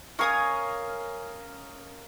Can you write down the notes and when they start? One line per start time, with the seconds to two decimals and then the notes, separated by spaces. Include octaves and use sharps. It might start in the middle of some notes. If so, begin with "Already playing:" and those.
0.19 C#4 A#4 D#5 F5 G#5 D#6